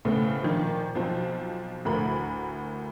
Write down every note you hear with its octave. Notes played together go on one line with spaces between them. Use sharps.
A2 C#3 A3 B3 C4
A#2 D#3 F3
B1 F3 C4 A5
D2 A2 A#4 B5